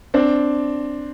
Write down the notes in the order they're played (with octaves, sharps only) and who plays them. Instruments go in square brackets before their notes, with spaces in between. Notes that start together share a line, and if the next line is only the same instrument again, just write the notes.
[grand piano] C4 D4